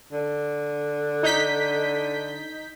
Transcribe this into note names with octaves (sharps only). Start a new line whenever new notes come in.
D3
D#4 G6 B6